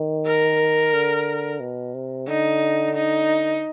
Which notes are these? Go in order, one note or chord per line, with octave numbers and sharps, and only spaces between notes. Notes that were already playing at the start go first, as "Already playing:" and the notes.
Already playing: D#3
A#4
D3
B2
C3
D3 D#4
D#4